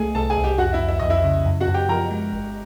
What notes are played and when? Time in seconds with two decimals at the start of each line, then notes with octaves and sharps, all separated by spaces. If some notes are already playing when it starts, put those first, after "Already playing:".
Already playing: C2 A3 G#4 A4 G#5
0.15 C2 A4 A5
0.30 G#4 G#5
0.37 C2
0.44 G4 G5
0.58 F2 F#4 F#5
0.73 E4 E5
0.81 F2
0.88 E5
1.00 F2 D#5
1.10 E4 E5
1.24 C#3
1.46 F#2
1.61 F#4 F#5
1.68 F#2
1.74 G4 G5
1.89 F3 A#4 A#5
2.11 G#3
2.33 G1